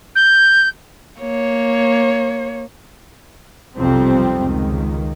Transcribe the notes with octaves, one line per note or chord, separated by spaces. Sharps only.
G6
A#3 C#5
B1 F2 C3 F3 G3 C4
C#2 D#3